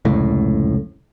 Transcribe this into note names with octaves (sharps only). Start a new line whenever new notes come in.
F1 C#2 A2